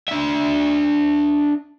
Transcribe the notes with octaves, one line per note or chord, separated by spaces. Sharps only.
D4 E5